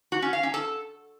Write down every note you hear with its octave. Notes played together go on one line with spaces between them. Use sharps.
F#4
C#4
F5
C#4
A4